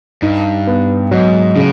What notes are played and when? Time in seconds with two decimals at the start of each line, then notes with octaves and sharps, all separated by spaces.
0.22 G2 D#4
0.67 B3
1.11 G#2 F#3
1.56 A2 C#3